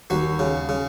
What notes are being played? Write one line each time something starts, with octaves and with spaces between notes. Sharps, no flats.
D#2 F#4
C#3
C#3